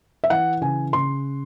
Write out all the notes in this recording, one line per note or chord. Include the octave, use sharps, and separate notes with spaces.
E5
E3 F#5
C#3 G#5
C#3 C6